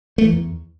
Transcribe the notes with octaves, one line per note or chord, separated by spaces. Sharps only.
A3
E3
E2